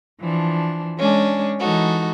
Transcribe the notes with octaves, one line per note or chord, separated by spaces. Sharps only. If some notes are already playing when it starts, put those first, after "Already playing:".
E3 F3 D4
G#3 C#4 D4
E3 G#3 D#4 F#4 A4